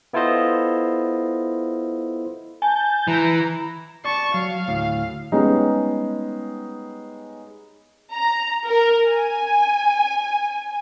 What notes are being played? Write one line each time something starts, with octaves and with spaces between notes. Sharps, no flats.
B3 E4 F4 A4 C5 D#5
G#5 A5 G6
E3 A#5
D5 A5 C#6
F#3 F5
D2 A2
G3 G#3 B3 C#4 D#4
A#5
A#4
G#5